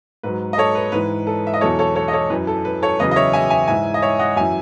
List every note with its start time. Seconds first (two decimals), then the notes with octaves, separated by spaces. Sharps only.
0.23 G#2 F#3 B4
0.53 D#5
0.58 A4 C#5
0.75 B4
0.92 G#2 E3 B4
1.27 A4
1.47 E5
1.54 D#5
1.61 E2 B2 F#3 A4 C#5
1.79 A4 C#5
1.95 A4 C#5
2.08 D#5
2.13 A4 C#5
2.30 F#2 E3 B4
2.47 A4
2.65 B4
2.82 A4 C#5
2.99 E2 C#3 F#3 B4 D#5
3.11 D#5
3.16 C#5 E5
3.33 E5 G#5
3.50 E5 G#5
3.68 G#2 E3 E5 G#5
3.94 D#5
4.02 C#5 E5
4.19 D#5 F#5
4.36 F#2 E3 E5 G#5